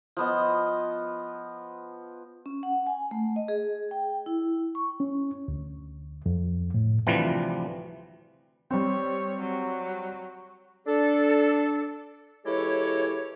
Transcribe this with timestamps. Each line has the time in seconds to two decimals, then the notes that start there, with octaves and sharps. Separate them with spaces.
0.17 F3 B3 D#5
2.46 C#4
2.63 F#5
2.87 G#5
3.11 A3
3.36 D#5
3.48 G#4
3.91 G5
4.26 E4
4.75 C#6
5.00 C#4
5.48 D2
6.26 F2
6.74 A2
7.07 D2 C3 E3 F3 G3
8.71 G3 C4 C#5
9.40 F#3
10.87 D4 A4
12.46 E3 G#3 E4 G4 A4 C#5